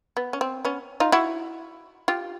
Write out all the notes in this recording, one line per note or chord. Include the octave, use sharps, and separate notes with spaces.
B3
C#4
C4
B3 C#4
D#4 F4
E4 F#4
F4 G4